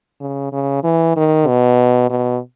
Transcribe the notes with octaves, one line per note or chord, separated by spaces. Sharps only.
C#3
C#3
E3
D#3
B2
B2